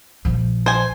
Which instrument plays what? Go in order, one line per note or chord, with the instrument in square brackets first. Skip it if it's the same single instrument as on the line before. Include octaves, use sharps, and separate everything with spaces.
[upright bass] A#1 F3
[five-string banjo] C5 G#5